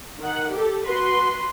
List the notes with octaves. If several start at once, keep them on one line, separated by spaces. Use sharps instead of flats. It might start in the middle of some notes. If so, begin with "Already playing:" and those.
D#3 F#5
G4 A4
F#4 B4 C6